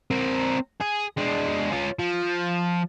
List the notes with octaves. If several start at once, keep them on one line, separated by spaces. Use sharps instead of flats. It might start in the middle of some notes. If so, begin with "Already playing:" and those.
C4 A#4
G#4
G#3 D4
C#4 F4
F3